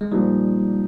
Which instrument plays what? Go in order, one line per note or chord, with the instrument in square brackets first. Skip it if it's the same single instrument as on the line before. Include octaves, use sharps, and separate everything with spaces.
[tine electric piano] G#3
[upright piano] A#2 F3 A#3 D#4 [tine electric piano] G3